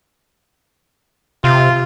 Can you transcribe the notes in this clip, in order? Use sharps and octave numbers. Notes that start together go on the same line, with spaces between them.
C3 F4